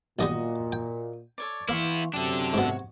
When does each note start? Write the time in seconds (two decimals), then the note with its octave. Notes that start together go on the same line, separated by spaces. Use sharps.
0.19 B1 A#2 D#3 G3 F#4 D#5 D#6
0.72 G5
1.38 A4 C#5 D5
1.69 E3 A#3 B3 E4 F5 C6 C#6
2.14 F#2 C3 D4 G4 A4 D#6
2.53 G#2 B2 F#4 C#5